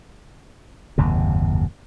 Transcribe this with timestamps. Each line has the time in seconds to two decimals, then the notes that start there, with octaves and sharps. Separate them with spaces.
0.98 F#1 D#2 G#2 C3